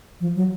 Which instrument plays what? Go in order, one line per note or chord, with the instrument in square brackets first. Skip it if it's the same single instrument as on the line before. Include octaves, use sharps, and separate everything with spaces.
[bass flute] F3
F#3